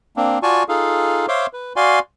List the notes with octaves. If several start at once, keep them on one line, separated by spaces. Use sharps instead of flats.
A#3 C4 D4
F4 F#4 D5 G#5 A5 C#6
D#4 F4 G#4 A4 F5
C5 C#5 E5 F5 C6 D6
B4
F#4 D5 F5 G#5 C6